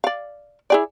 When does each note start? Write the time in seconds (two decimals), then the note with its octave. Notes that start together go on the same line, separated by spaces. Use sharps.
0.04 D5 F5
0.70 E4 G#4 D5